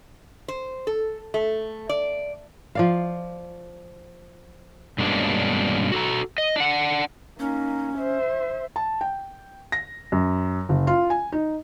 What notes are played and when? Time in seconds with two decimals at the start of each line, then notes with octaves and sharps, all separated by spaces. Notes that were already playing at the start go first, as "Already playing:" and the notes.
0.48 C5
0.87 A4
1.34 A3
1.89 D5
2.75 F3 D5 F5
4.98 G2 B2 G#3 A#3 C#4 D4
5.92 F#4 A4 A#5
6.38 D#5
6.56 D4 F#5
7.40 A#3 C#4 D#4
7.98 C5 E5
8.76 A5
9.01 G5
9.72 A#6
10.12 F#2
10.69 F#1
10.87 F4
11.10 G#5
11.32 D#4